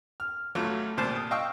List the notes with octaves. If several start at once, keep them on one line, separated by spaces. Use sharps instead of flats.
F6
A1 F#3 A3 F4
C2 A#2 C5 A5
D#6
D#5 F5 G5 C#6 E6